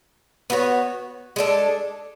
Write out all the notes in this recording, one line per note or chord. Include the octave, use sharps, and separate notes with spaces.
B3 F#4 C#5
G#3 D4 A4